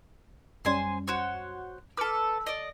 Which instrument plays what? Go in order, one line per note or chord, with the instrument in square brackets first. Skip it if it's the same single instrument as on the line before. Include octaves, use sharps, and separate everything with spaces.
[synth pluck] F#2 G3 C#4 [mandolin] C5 G#5 C6
[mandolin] F#4 C5 C#5
[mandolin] A4 B4 [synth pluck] D6 F6 C#7
[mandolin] D5 D#5